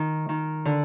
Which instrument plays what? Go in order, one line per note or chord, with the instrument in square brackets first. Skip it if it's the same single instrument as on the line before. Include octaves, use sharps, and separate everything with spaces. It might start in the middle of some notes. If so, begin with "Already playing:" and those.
Already playing: [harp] D#3
D#3
D3